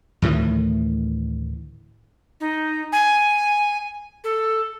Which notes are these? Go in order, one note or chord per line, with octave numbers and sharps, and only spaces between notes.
D2 A2 D#3 E3
D#4
G#5
A4